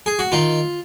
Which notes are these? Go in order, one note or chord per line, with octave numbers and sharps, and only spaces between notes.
G#4
F#4
D#3 F4